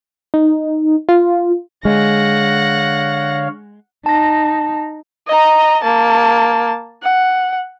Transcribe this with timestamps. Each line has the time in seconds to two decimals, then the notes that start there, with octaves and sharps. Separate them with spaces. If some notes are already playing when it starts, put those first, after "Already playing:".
0.34 D#4
1.09 F4
1.85 D3 G#3 C#5 F5 F#5 A#6
4.06 D#4 A5 A#6
5.28 D#5 A#5
5.83 A#3 A5
7.02 F#5